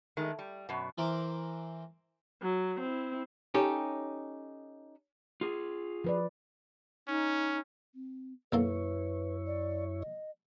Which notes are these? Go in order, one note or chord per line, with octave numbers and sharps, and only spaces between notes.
D#3 G#3 A3
G3
F#2 B2
E3 A#4 C5 D6
F#3
C4 E4
C#4 D#4 G4 A4
F4 G#4
F3 B4 D5
C#4 D#4
C4
B1 F#2 A#3 E4 A4 B4 C#5
D5
D#5